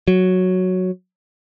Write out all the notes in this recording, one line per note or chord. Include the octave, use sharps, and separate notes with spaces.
F#3